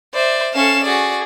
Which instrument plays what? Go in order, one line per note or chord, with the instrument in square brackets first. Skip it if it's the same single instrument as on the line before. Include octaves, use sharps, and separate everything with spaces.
[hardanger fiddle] C5 E5 [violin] D5
[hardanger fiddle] C#4 A4 [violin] F5 E7
[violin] F#4 D5 [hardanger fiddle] G#4